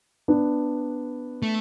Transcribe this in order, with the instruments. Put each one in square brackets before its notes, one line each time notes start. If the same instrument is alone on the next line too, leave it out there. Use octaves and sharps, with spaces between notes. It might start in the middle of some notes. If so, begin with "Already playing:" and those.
[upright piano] B3 D4
[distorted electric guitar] A3